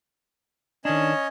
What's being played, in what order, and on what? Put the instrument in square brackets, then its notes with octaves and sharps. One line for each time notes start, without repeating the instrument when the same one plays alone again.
[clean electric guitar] D#3 D4 [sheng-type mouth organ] C#4 C#5 D#5